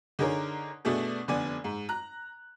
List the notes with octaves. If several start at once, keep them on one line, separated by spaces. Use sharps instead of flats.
D3 D#4 G#4 A#4 C#5
B2 A3 B3 D4 G#4
F1 D3 B3 D5 G#5
G#2
A#5 F#6